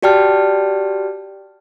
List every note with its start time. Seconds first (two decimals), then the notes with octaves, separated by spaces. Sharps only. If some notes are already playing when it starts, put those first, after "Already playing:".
0.03 F#4 G4 D5 G5 A5 F6